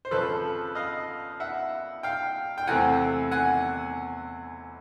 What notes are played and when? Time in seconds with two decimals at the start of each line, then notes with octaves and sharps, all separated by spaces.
0.05 C5
0.11 F2 C#3 F3 A4 B4
0.75 D#5 F5
1.40 E5 F#5
2.03 F5 G5
2.58 G5
2.67 E2 C3 E3 A3 C4 F#5 G#5
3.31 F#5 G#5